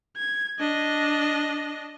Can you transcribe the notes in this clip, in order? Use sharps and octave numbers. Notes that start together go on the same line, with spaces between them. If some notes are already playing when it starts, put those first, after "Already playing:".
G#6
D4 D#5